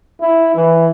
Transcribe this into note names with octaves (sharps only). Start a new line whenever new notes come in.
E4
E3